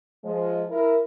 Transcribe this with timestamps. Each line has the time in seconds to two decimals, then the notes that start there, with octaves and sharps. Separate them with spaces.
0.24 F3 G#3
0.70 E4 A#4